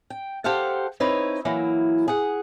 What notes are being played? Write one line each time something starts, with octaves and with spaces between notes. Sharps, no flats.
G5
G4 A4 C5 F5 F#5
C4 D#4 E4 B4 C#5
E3 F#3 A#3 E4
G#4 F#5